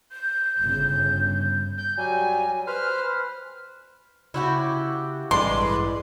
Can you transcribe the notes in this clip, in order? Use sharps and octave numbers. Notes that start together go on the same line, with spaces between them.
G6
G1 C#3
G6
F#3 G3 G#5
B4 C5 F6
C#3 E4 F#4 G4
A1 G2 E3 G#3 A4 B4 D5 C6